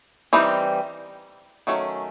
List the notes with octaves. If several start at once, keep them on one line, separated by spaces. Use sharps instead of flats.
E3 G3 C4 D#4
D#3 F#3 A3 C#4